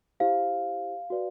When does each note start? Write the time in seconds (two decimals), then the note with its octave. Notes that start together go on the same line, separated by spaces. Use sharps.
0.20 E4 G4 C5 F5
1.10 F#4 B4 D5